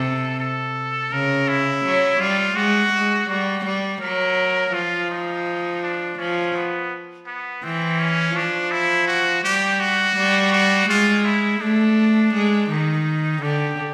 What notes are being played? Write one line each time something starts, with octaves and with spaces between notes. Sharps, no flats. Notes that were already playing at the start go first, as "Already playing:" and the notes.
Already playing: C3 A4
A4
C#3 A#4
E4
F#3
G3 F4
G#3 F#4
G#3
G3 F#4
G3
F#3 A#4
F3 F4
D#4
D4
F3 C#4
B3
B3
E3 C4
C#4
F3 D4
E4
F#4
G3 G4
F#4
G3
F#4
G#3 F4
E4
A3 D4
G#3
D#3 D#4
D3 G4